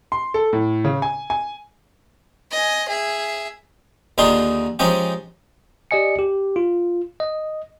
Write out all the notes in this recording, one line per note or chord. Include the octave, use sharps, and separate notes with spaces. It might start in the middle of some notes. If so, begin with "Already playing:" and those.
C6
A4
A2
C#3
G#5
G#5
D#5 G#5
G#4 E5
D#2 D3 D#4 F4 G#4 C6
F3 G#3 C#4 D#4 G4
G4 D5 D#5 G#5 C#7
G4
F4
D#5